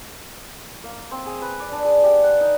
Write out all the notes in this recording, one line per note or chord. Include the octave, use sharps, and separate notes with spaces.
A#3
C4
G#4
B4
D5
D4
G#4
G4
F#5
D#4